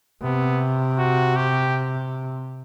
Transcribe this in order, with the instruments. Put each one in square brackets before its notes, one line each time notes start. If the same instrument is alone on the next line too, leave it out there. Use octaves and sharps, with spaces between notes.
[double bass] C3 [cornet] B3
[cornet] F#4
G4